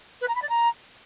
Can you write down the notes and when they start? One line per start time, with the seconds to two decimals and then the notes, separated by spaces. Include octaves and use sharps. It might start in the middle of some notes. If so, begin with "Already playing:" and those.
0.21 B4
0.28 A#5
0.35 B5
0.42 D5
0.49 A#5